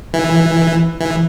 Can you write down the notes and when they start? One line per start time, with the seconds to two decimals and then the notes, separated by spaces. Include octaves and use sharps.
0.14 E3
1.00 E3